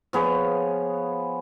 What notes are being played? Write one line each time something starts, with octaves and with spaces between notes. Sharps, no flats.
F3 B3 G#4 C#5